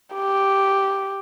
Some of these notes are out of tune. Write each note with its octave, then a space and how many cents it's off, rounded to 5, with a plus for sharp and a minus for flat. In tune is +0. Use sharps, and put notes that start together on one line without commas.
G4 -5